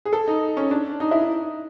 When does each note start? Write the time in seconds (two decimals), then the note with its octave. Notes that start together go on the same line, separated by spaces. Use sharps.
0.05 G#4
0.13 A4
0.28 D#4
0.57 C#4
0.71 D4
1.00 D#4
1.11 E4
1.22 D#4